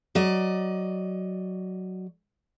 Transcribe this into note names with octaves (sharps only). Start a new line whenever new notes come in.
F#3 D5 D#5